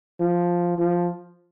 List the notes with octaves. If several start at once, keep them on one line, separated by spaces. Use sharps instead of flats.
F3
F3